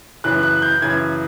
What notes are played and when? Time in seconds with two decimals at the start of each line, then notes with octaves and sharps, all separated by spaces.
0.24 F#2 C#3 E3 F#6
0.43 F#6
0.62 G6
0.82 F#2 C#3 E3 G#6